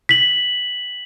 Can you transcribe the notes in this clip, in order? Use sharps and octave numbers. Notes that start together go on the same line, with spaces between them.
B6 F#7